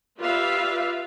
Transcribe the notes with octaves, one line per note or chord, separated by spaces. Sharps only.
F4 G4 B4 D5 E5 F5